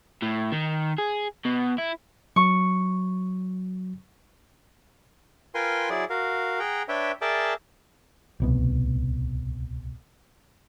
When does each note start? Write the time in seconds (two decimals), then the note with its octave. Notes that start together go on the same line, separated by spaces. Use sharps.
0.22 A2
0.52 D#3
0.98 G#4
1.45 B2
1.78 E4
2.36 F#3 C#6
5.55 F4 A#4 B4 G5 G#5 C6
5.90 F#3 E4 G#4 D5
6.10 F#4 A#4 F5
6.59 G#4 F#5 G5 A#5
6.88 D4 B4 C#5 E5 G5
7.21 G#4 A#4 D5 E5 G5 A5
8.40 D1 C2 B2